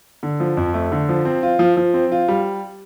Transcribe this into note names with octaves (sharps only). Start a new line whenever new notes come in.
D3
F3
F2
A3
D3
F3
C4
F4
F3
F3
C4
F4
G3